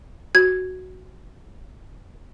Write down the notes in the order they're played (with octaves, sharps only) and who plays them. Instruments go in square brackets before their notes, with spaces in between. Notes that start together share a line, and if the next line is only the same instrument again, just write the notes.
[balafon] F#4 [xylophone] G#6